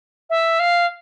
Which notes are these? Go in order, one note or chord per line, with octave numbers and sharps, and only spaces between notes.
E5
F5